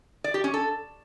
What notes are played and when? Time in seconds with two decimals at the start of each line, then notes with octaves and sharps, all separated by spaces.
0.24 D5
0.34 G4
0.44 C#4
0.54 A4